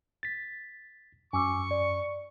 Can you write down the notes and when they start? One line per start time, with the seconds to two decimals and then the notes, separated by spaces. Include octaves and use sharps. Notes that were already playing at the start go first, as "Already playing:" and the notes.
0.23 A6 B6
1.33 F#2 G#5 C#6 D6 E6
1.71 D5